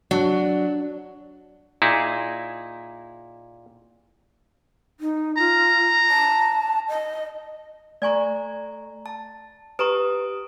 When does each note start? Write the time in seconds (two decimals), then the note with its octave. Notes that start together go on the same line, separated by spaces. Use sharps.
0.11 F#3 D4
1.82 A#2 D#4 E4 G#4
5.00 D#4
5.38 F4 A#5
6.09 A5
6.89 D#5
8.02 A3 D5 G#5 A#5 C#6
9.06 A5
9.79 G4 B4 A#5 C#6 D#6 D7